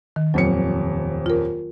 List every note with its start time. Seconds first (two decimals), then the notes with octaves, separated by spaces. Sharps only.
0.16 D#3
0.34 D#1 F2 F#3 C#7
1.26 F4 A#4